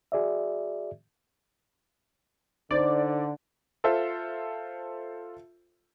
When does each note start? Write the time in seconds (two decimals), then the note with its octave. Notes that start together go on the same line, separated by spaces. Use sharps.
0.12 F#4 G#4 D5 E5
2.71 D3 D#4 C5 D5 D6
3.84 F4 A4 C5 E5